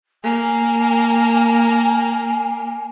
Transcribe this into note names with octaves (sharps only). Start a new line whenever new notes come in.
A#3 G#5